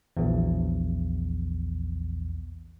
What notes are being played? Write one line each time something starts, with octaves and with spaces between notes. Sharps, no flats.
A#1 E2